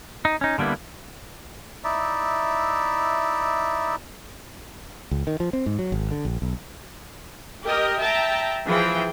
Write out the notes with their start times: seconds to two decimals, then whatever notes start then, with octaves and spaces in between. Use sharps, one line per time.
0.25 D#4
0.41 C#4 D#4
0.58 D3 G3 A#3 B3 E4
1.84 D#4 E4 D5 E5
5.11 C#2
5.27 D#3
5.40 F3
5.53 C4
5.66 G#2
5.79 F#3
5.92 G#1
6.11 D3
6.25 A#1
6.42 B1
7.65 G4 A#4 D#5 G5
8.00 E5 G5 A5 A#5
8.67 E3 F3 G#4 G5